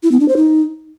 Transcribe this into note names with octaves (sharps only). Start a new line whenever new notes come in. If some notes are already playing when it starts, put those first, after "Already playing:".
E4
B3
D4
C5
D#4